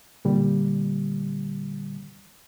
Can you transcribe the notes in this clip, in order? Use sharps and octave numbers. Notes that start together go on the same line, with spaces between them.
A#2 D3 G3